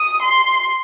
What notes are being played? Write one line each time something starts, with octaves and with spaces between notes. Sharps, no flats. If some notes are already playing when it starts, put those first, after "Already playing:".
Already playing: D#6
C6